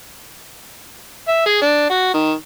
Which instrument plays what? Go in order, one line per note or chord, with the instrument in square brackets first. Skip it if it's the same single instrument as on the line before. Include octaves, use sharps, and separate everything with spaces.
[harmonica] E5
G#4
D4
F#4
D#3